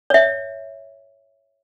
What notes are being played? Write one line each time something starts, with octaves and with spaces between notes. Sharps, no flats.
C#5 E5